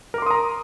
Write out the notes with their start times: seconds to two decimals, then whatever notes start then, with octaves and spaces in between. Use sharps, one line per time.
0.14 A#4
0.18 D6
0.22 C6
0.26 D#6
0.31 A#5